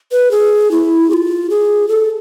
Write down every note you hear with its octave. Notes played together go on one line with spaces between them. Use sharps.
B4
G#4
E4
G#4
F4
G#4
A4